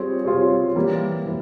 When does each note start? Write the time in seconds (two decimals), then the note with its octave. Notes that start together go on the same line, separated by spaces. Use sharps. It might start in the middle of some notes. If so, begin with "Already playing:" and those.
Already playing: G3 C4 F4 G#4 C#5
0.25 G3 C4 F4 G#4 C#5
0.75 E3 G3 A#3
1.26 E3